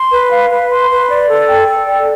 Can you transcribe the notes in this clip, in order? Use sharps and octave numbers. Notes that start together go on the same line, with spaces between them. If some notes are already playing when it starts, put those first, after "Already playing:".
Already playing: C6
B4
F5
B4
C6
B4
D5
A4
G5
A4
D5